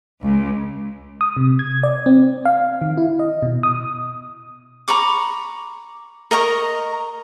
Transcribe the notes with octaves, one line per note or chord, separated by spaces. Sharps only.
C#2
D#6
C3
G#6
D5
C4
F5
D#3
E4
D#5
B2
D#6
A#5 B5 C#6 D6
A#4 D#5 A#5 C#6